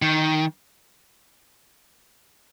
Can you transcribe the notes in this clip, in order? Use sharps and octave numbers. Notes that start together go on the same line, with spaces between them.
D#3